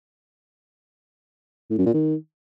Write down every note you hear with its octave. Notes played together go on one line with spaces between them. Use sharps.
A2
F#2
A#2
D#3